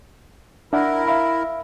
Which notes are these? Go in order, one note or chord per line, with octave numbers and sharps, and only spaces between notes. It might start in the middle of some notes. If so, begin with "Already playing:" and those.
D4 E4 A#4 E5 F#5
E5 F5 B5